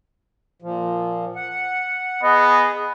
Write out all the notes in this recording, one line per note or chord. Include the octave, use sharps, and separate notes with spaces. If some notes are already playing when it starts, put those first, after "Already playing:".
A#2 F3
F#5
B3 G#4 D#5